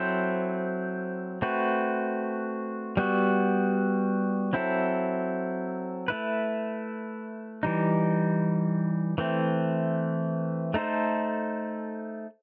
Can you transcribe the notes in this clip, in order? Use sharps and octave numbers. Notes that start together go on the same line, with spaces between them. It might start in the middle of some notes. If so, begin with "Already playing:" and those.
Already playing: F#3 C4 E4 A4 C5
A3 C4 F#4 B4
G3 B3 F#4
F#3 C4 E4 A4
A3 E4 B4
E3 G3 D#4
E3 A3 C4
A3 D#4 A4 C5